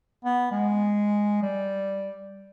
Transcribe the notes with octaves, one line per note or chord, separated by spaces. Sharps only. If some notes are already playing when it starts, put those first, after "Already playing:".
B3
G#3
G3